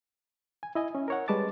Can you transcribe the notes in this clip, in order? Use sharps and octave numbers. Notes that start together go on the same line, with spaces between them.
G#5
E4 D#5 G#5
C#4
A#4 C#5 F#5
G3 G#3 B4 A5 D6 A6